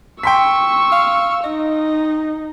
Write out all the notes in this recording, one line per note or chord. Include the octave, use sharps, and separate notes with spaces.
G5 C6 C#6 E6 B6
F5
D#4 D#5